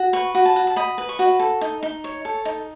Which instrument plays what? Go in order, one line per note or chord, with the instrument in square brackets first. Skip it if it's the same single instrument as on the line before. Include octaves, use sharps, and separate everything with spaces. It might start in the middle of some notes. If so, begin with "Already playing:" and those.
Already playing: [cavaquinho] F#4
B4 C#6
F#4
A5
F#4
A5
D#5 B5
B4
C#6
F#4
A4
D#4
D#4
C#5
A4
D#4